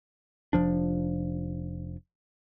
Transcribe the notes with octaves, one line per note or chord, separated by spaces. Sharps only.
F1 F2 F3 D4